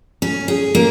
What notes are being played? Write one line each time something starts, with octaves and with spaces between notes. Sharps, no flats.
C#4
G#4
A#3